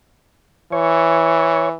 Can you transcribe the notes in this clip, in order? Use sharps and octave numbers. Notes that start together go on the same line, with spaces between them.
E3 C#5